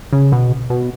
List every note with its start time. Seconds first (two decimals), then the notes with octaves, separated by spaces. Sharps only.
0.13 C#3
0.32 B2
0.70 B2